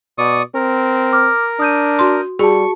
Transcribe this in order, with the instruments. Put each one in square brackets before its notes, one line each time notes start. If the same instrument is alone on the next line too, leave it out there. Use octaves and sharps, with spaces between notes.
[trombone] B2 [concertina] D5 C#6 D#6
[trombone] C4 [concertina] A#4
[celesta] D6 F6
[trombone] D4 [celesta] D#6 G6 D#7
[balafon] F#4 C6
[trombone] G3 [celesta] F#4 A5 [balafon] G#4 [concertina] C#6